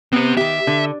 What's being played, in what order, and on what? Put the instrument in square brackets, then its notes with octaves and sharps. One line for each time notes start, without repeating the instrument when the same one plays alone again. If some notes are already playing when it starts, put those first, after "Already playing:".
[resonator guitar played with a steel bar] B3 [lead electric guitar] C4 G4
[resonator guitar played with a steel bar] D#3 G4 [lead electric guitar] E5
[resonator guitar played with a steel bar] D3